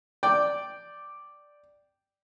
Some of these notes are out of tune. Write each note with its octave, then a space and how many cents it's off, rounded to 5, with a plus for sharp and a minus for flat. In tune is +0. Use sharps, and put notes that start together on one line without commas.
D5 +0 G5 -5